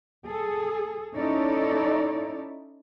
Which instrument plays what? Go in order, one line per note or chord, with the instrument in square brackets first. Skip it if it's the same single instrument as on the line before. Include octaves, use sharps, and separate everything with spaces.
[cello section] G#4 A4
C#4 D#4 E4 A4 C#5 D5